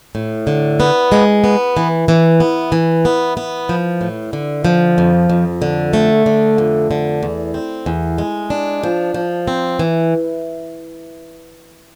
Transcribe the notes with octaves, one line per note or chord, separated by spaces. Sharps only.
A2
D3
B3
G#3
B3
E3
E3
B3
E3
B3
B3
F3
A2
D3
F3
F2
F2
D3
A3
D3
F2
D3
E2
C4
E2
G#3
D4
F3
F3
C4
E3